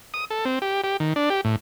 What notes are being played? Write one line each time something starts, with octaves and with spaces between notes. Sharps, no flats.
D#6
A4
C4
G4
G4
D#3
D4
G4
A2